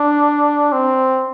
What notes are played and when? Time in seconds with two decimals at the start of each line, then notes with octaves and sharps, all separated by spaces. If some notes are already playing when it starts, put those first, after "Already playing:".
Already playing: D4
0.72 C4